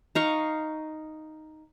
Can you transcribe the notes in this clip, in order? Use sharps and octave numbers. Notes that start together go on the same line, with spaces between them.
D#4 F5 C#6